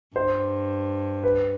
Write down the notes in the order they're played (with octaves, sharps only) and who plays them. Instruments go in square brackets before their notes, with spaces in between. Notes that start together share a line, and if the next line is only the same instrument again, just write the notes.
[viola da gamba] G2 [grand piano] C5
[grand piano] B4